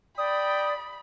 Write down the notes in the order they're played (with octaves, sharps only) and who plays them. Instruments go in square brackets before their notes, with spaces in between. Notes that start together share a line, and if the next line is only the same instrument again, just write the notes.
[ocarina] D5 [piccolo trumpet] G5 [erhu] B5 [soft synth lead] D#6